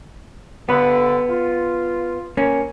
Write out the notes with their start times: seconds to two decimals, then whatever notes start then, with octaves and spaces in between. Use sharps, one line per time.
0.69 G2 D3 B3 B4
1.30 F4
2.37 A#3 C#4